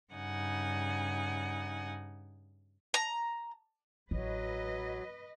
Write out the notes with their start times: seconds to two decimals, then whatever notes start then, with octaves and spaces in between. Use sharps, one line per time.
0.13 G2 C#3 D#4 F#5 G#5
2.94 A#5
4.11 A1 F#3 B4 D#5